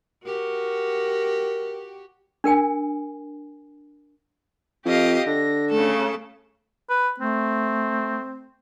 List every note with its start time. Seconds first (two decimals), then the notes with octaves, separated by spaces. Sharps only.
0.24 F#4 G4 A#4
2.44 D4 A#4 G5 G#5
4.85 F2 G4 D#5 F5
5.26 D3 A#6
5.70 C#3 A3 A4
6.89 B4
7.19 A3 C4